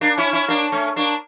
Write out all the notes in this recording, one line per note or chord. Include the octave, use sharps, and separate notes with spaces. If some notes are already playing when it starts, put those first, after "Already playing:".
A#3 D4
C#4 E4
C#4 E4
A#3 D4
A3 C#4
A#3 D4